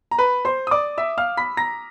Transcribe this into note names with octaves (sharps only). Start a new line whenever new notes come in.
A#5
B4 B5
C5 C6
D#6
D5 D6
E5 E6
F5 F6
B5 B6
A#5 A#6